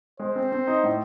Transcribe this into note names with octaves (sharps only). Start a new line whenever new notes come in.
G#3 C5
C4
C4
D#4
A2